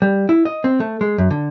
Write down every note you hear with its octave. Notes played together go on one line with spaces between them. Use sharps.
G3
E4
D#5
C4
A3
G#3
F#2
D3